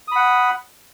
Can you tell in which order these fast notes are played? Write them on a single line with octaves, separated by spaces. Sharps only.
D#6 B5 F#5